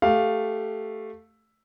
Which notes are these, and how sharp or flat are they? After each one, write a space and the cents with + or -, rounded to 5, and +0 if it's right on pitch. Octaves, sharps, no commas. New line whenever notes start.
A3 +0 G4 +0 F5 +5